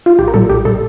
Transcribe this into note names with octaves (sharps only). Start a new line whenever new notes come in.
F4
A#1 G4
A#4
A#2 G3 A4
A#1 G4
A#2 G3 A4